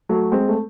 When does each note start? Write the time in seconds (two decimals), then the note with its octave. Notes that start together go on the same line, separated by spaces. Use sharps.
0.09 F#3 A3
0.32 G#3 C4
0.49 A3